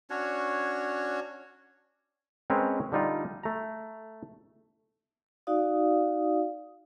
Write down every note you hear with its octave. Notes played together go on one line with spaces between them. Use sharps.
C#4 D4 F#4 C#5
G#3 C4 C#4 A#4 B4 C#5
D3 G3 D#4 F4
A3 A#5
D#4 F#4 D5 F5 D#6